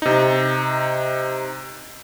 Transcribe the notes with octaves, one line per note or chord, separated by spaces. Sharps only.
C3 D#4